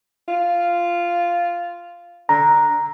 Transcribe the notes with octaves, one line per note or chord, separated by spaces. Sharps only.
F4
D3 A#5